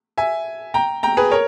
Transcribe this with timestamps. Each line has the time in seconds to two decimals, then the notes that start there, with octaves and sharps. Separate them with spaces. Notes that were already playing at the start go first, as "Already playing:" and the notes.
0.18 E5 G#5
0.74 G5 A#5
1.03 G5 A#5
1.17 G#4 B4
1.31 A#4 C#5